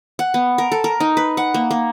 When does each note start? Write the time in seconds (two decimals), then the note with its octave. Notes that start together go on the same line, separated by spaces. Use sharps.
0.19 F#5
0.34 B3
0.58 A#4
0.72 A4
0.84 A#4
1.00 D#4
1.17 B4
1.37 F#5
1.54 A#3
1.71 A#3